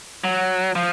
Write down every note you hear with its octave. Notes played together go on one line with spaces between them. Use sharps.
F#3
F3